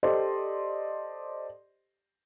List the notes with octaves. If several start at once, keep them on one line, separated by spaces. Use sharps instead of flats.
G4 A4 C5 D5 D#5 C6